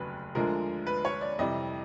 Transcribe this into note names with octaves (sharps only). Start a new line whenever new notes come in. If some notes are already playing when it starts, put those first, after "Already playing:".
Already playing: F1 D#2 C#3 F#3 B4
D2 D3 F3 G#3 A#4
B4
C#5
D5
F2 C3 E3 G3 D#5